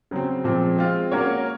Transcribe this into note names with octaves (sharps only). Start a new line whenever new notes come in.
C#3 F#3 C4
A#2 F3 G#3 C4
G#3 C4 F4
A#3 C#4 F#4 A#4 C#5